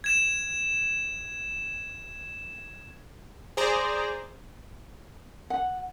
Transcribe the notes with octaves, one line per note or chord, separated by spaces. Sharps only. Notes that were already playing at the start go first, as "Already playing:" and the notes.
G#6 E7
G#4 C5 D5 A#5
F#5